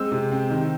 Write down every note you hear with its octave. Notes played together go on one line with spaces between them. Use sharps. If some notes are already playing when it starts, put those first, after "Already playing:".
Already playing: G#3 C4 E6
C3
C4
D#3